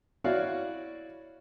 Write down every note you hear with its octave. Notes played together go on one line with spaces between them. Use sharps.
E4 F#4 C#5 D5 F5